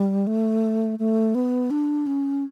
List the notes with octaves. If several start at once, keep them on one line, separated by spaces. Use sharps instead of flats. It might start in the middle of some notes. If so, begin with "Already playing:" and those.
Already playing: G3
A3
A3
B3
D4
C#4